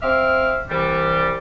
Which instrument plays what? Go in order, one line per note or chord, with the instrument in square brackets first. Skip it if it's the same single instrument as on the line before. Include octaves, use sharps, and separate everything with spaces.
[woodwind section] C4 E5 F5 D6 F6
C2 E3 G3